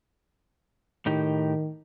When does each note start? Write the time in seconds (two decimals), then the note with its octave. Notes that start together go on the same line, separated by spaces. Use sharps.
1.06 A2 D#3 D#4 G4